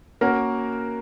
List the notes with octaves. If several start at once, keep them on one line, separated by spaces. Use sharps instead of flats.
A#3 C#4 F#4 A#4